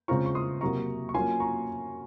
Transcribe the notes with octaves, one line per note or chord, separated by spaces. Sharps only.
C#3 G#3 C4 F4 A#5 C#6
C#6
C6 D#6
C3 F#3 A#3 A#5 C#6
C#6
F#3 A#3 C#4 F4 G#5 C6
A#5 C#6